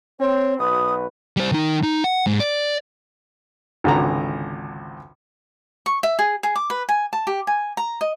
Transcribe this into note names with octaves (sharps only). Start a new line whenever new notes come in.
C4 C#5
B1 F#4 B4 D#6
G3 C5
D#3 D#4
D#4
F#5
G#2
D5
G#1 C#2 D3 A#5
C#6
E5
G#4
G#4
D6
B4
G#5
A5
G4
G#5
A#5
D#5